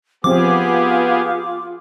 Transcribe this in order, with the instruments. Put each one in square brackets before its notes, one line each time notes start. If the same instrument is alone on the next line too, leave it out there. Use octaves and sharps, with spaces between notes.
[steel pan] F3 C4 [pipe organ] B3 G4 G#4 [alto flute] F4 [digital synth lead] D6